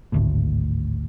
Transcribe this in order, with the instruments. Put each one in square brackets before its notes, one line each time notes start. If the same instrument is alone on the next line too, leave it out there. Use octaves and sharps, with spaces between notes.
[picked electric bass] G#1 D2 A2